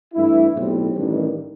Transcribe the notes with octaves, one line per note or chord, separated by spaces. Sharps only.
G2 E3 A3 E4
B1 A2 G3 C4
A1 G2 D#3